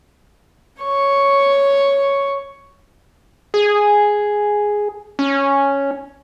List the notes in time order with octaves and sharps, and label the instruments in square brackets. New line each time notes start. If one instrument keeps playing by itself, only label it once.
[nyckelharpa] C#5 C#6
[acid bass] G#4
C#4